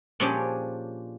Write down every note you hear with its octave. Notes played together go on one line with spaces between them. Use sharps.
A#2 F3 C#4 D4 G4 G#4